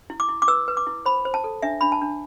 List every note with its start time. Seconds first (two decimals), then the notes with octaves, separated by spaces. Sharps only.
0.10 E4
0.20 D6
0.29 E4
0.42 D6
0.48 B4 E6
0.68 B4
0.77 D6
0.87 E4
1.06 C5 B5
1.25 C5
1.34 A5
1.44 A4
1.62 D4 E5
1.81 D4 B5
1.92 A5
2.02 D4